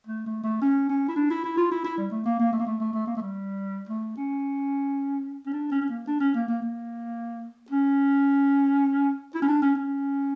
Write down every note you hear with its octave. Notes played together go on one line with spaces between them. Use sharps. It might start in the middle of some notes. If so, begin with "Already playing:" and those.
A3
A3
A3
C#4
C#4
E4
D4
E4
E4
F4
E4
E4
G3
A3
A#3
A#3
A3
A#3
A3
A3
A3
A#3
A3
G3
A3
C#4
C#4
D4
C#4
C#4
A#3
D4
C#4
A#3
A#3
A#3
C#4
E4
C#4
D4
C#4
C#4